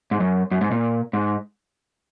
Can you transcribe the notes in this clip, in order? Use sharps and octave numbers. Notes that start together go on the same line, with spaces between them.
G#2
F#2
F#2
G#2
A#2
G#2